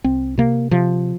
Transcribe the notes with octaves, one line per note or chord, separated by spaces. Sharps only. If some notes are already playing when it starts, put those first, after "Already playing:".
C2 C4
C3 A#3
C3 F3